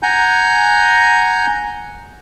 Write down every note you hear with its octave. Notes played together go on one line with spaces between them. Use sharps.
F#5 G#5 A#5 G6